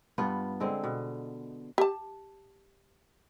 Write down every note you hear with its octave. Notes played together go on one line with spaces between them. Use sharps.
G2 B3 F4
D3 G#3 C4
B2
G4 A5